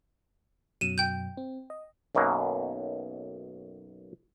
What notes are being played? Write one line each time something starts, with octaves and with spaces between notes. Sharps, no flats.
F#2 B2 F#3 D#7 E7
G5 G6
C4
D#5
B1 F#2 B2 F#3 A#3